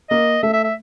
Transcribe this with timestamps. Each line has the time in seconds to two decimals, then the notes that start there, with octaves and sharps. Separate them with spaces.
0.10 A#3 D#5
0.43 A3 E5
0.54 E5
0.64 E5